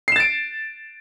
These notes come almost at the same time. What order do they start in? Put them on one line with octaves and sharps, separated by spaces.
C7 E7 A6 D7